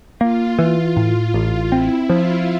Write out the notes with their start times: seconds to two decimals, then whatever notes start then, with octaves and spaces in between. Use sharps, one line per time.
0.21 A#3 F4
0.59 E3
0.97 A2
1.34 A1
1.72 C4 E4
2.09 F3 F4